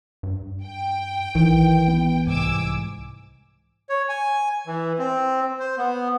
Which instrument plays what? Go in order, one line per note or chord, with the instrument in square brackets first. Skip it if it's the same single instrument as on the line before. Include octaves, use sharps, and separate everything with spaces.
[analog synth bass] G2
[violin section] G5
[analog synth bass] B1 [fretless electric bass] D#3 [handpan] E3
[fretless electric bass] B3
[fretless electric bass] C2 G#2 [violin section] G#5 D6 E6
[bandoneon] C#5
G#5
E3
C4
C5
B3